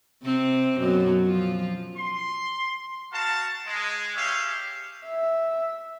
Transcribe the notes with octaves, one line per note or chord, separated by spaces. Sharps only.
C3 C4
F#2 B2 F#3
F3 F4
C6
F#4 A#4 F5 A5
G#3
G4 G#4 C#5 E5 F5
E5